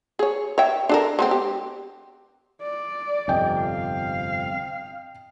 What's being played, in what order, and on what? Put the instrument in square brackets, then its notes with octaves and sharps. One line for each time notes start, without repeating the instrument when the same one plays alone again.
[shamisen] G#4 C#5
C#5 E5 G5
D4 A4 A#4
G#3 B3 C4
G4
[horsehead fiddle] D5
[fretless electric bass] G1 F2 C3 [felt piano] D#5 G5
[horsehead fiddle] F5